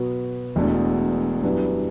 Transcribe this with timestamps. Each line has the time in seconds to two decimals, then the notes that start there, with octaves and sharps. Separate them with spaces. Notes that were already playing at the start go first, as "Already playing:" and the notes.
Already playing: B2 F#3 B3
0.56 E1 E2 B2 A3 D4
1.43 F#2 E3 G3 B3 D4